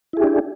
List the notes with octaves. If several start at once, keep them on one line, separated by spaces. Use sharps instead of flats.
D4 E4 G4 G#4